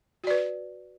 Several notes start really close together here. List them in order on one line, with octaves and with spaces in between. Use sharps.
F#4 D5 B4